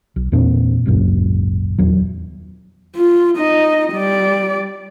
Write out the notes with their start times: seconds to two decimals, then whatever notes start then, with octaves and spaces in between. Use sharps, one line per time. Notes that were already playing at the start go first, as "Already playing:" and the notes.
0.16 B1
0.32 E2 A#2 C4 D4
0.86 G#1 C#2 F#2 A#2
1.78 D#1 E2 F#3
2.97 F4
3.37 D#4 D#5
3.93 G3 D5